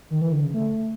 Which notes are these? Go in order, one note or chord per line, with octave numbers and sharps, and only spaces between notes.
D#3
E3
D3
C#3
A3